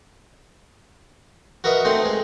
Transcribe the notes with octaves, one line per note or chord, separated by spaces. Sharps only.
F#4 A#4 B4 D#5 E5 F#5
A3 C4 D#4 C6
G#3